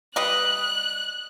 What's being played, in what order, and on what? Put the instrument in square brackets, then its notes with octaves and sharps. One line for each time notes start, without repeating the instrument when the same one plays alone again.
[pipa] G3 B4 D#5 [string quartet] F#6